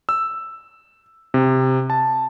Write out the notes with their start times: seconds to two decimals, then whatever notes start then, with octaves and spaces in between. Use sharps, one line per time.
0.09 E6
1.34 C3
1.90 A5